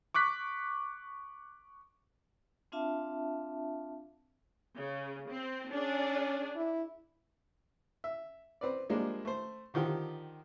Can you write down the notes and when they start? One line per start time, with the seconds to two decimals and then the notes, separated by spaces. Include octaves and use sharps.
0.14 C#6 D6 F#6 B6
2.72 C4 D4 F4 E5 F5 A5
4.75 C#3
5.29 C4
5.72 C#4 D4 G#4
6.56 E4
8.04 E5
8.61 C4 B4 D5
8.89 F3 G3 G#3 A#3 D4
9.25 A3 C5
9.74 D3 D#3 F3 F4 G4